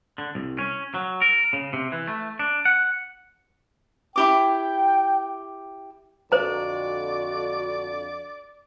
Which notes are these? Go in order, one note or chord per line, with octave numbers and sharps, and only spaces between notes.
D3
C2
C#4
F#3
A#4
C#3
C3
E3
A3
D4
F#5
E4 G4 G5 D6
F2 D3 F#4 C5 D5 A#5